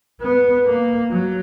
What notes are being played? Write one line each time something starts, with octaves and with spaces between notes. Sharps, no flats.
B3
A#3
F#3